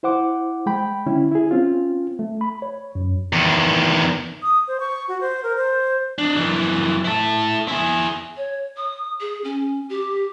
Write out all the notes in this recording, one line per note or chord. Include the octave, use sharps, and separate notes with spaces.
E4 C5 F#5 D6
G#3 G5 B5
D3 C#4 E4
E4 G#4
C4 C#4 F4
A3
B5
C#5
F#2
E2 D#3
D#6
C5
C#6
F#4
C5
A#4
C5
D4 D#4
F#2 E3
E4 A4
E4 G#4
C#5
D#6
G#4
C#4
G4